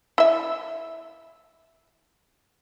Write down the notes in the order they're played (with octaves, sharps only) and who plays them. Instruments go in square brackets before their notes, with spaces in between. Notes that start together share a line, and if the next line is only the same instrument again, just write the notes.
[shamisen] E4 E5